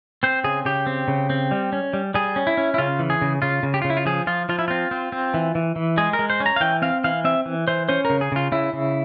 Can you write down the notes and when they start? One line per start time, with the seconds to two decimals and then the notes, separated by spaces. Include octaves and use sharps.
0.23 C4 C5
0.44 C#3 G#4
0.65 C#3 G4
0.87 C4
1.08 C#3
1.30 C4
1.51 G3
1.73 C#4
1.93 G3
2.14 G3 G#4
2.36 C#4
2.47 E4
2.57 C#4
2.74 E4
2.78 C#3 F4
2.99 E3
3.10 G#4
3.22 C#3
3.42 C#3 F4
3.63 C#3
3.74 G4
3.82 F4
3.84 C#3
3.90 E4
3.97 F4
4.05 F3 G#4
4.27 F3 F4
4.49 F3 F4
4.59 E4
4.68 C4 F4
4.91 C4
5.12 C4
5.34 E3
5.55 E3
5.76 E3
5.98 G#3 G#4
6.13 A#4
6.19 G#3
6.30 C5
6.40 C#4
6.46 A#5
6.56 F5
6.61 E3 G5
6.82 C4 F5
7.04 E3 F5
7.24 C4 E5
7.46 E3
7.68 E3 C5
7.89 C#4 C5
8.05 A#4
8.10 C#3
8.21 G#4
8.32 C#3 F4
8.52 C#3 E4
8.73 C#3